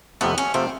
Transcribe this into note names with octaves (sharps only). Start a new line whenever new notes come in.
F2 C3 F3 A3 B3
C#4
C3 F3 A3 C4